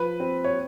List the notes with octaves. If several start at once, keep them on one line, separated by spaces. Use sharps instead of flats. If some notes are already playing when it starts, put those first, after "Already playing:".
Already playing: F3 B4
C4
C#5